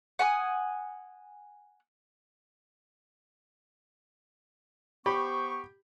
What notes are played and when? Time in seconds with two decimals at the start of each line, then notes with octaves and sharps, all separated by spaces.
0.19 F#5 G#5 D#6
5.06 B3 G4 C5 B5 C#6